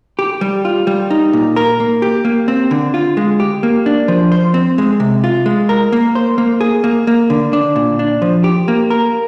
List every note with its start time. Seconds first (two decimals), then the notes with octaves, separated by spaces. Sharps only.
0.19 G4
0.41 G3
0.65 F4
0.87 G3
1.10 D#4
1.33 A#2
1.56 A#4
1.80 A#3
2.02 G4
2.25 A#3
2.48 C4
2.71 D3
2.94 F4
3.17 G#3
3.40 G4
3.63 A#3
3.86 D4
4.08 F3
4.32 C5
4.54 C4
4.78 G#3
5.00 C3
5.24 F4
5.46 G#3
5.69 A#4
5.92 A#3
6.15 C5
6.38 A#3
6.61 G#4
6.84 A#3
7.07 A#3
7.30 D3
7.53 D4
7.76 A#2
7.99 D4
8.22 F3
8.44 G4
8.68 A#3
8.90 A#4